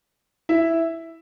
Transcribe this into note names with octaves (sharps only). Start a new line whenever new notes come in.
E4 E5